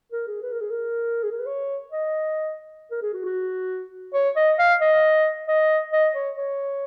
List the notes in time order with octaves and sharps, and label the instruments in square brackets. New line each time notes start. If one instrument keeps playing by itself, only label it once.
[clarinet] A#4
G#4
B4
A#4
G#4
A#4
G#4
A#4
B4
C#5
D#5
A#4
G#4
F#4
F#4
C#5
D#5
F5
D#5
D#5
D#5
C#5
C#5